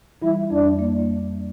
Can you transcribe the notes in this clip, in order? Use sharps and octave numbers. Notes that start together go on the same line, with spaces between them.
E3 G3 E4
F2 D4
A#3